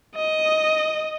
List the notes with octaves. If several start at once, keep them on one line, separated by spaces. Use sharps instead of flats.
D#5